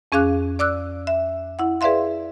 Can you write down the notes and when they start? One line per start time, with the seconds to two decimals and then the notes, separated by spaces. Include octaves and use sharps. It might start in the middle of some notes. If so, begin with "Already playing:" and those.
0.12 F2 C#4 G#4 F5 D6 F#6
0.59 D5 D6 E6 F#6
1.07 E5
1.59 E4 F#5
1.81 G#4 B4 D5 E5 F5 C6